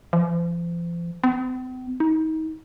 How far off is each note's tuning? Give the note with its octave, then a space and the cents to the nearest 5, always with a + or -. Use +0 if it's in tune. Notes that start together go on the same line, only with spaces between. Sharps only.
F3 -40
C4 -45
D#4 +30